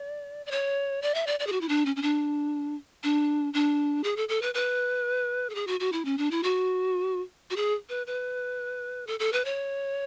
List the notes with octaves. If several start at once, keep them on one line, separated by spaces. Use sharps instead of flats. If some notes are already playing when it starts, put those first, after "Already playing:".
Already playing: D5
D5
C#5
D5
E5
D5
D5
G#4
F#4
E4
D4
C#4
C#4
D4
D4
D4
G#4
A4
A4
B4
B4
A4
G#4
F#4
F#4
E4
C#4
D4
E4
F#4
F#4
G#4
B4
B4
A4
A4
B4
C#5